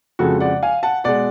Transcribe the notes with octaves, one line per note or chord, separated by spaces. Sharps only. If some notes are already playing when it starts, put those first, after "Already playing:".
F2 C#3 F3 G#3 F#4 A4
D5 F#5
F5 G#5
F#5 A5
B2 G#3 D5 F#5